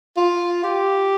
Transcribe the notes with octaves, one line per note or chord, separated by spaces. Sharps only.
F4
G4